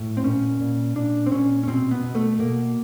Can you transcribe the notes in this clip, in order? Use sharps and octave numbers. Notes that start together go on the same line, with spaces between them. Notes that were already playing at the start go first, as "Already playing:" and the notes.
Already playing: A2
C4
A#2 C#4
A#2
A#2 D4
C4
A#2 C#4
C#4
B2 C4
B3
B2
A3
B2 A#3